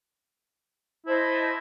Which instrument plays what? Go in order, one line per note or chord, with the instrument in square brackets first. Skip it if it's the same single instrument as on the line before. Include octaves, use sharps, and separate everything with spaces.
[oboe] E4 [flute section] C5 D#5 A5